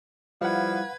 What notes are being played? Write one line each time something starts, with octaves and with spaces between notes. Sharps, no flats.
F3 G3 E4 B4 F5 F#5 G#6